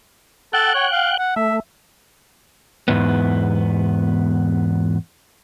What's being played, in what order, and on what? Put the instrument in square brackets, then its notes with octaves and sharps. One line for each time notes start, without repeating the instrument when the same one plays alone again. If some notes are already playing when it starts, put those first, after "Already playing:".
[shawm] A4 [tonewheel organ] F#5 G5 F#6
[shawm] C#5
F5
F#5
[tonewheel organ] A3 [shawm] E5
[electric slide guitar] E2 G#2 B3